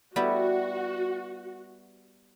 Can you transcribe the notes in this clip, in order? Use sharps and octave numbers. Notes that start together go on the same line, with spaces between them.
G3 B3 E4 F#4